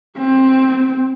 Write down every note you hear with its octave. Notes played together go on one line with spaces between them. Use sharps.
C4